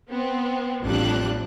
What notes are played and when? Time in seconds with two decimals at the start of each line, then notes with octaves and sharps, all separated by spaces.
0.10 B3 C4
0.85 A1 F2 F3 G3 D4 F#6